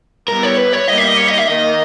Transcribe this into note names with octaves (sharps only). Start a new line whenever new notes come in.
G3 B3 E4 G4 A#4
C#5
B4
C#5
G3 A#3 D#4 G4 D#5
E5
D#5
C#5
D#5
E5
D#3 A#3 D#4 D#5